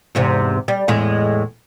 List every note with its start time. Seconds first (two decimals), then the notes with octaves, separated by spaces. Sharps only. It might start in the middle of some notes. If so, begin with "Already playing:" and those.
0.15 E2 G#2 C3
0.68 G3
0.88 E2 A2 G#3